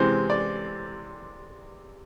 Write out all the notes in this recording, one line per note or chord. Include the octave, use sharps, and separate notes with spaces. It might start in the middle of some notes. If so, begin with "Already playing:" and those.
Already playing: C3 E3 G#3 C5
D5